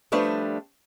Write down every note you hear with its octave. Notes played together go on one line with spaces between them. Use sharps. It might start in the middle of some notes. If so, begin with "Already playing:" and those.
F3 G3 A3 D4 B4